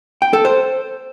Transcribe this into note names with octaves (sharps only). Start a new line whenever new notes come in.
G5
A4
C5